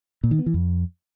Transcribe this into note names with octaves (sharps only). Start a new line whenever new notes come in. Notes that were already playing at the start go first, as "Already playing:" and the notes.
A#2
D#3
B3
E3
F2